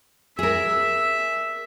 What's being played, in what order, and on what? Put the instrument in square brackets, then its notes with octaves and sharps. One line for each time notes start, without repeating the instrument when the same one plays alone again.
[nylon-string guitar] G#4 A#4 [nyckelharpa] E5